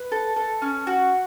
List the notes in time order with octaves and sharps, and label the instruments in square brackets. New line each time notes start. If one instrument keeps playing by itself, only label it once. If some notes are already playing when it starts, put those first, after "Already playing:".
Already playing: [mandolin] B4
A4
A4
C#4
F#4